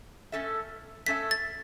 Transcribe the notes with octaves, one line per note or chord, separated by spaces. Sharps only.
A3 C#4 A4 E5
A3 C#4 A4 E5 B6
A6